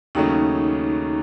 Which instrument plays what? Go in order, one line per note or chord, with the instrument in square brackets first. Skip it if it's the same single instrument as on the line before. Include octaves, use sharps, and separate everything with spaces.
[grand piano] D#2 C#3 F#3 A3 C#4 [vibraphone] D#4